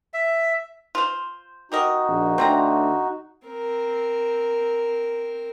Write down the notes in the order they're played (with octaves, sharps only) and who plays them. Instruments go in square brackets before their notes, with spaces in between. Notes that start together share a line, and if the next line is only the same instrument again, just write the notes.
[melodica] E5
[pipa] F4 C5
[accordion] D#4 F#4 [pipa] G4 A#4 D#5
[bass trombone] A#1
[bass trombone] D2 [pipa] C4 F4 A#5
[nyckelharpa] C4 A#4